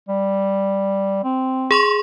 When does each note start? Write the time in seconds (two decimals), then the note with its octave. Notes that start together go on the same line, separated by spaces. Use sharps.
0.09 G3
1.24 C4
1.71 G#4 C6 C#6